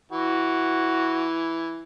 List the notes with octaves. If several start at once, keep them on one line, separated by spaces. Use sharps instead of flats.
E3 F#4